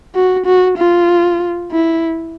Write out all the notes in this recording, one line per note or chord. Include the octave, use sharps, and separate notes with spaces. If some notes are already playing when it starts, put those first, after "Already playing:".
F#4
F#4
F4
E4